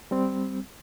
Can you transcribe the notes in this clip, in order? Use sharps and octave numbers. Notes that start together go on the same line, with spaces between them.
G3 C4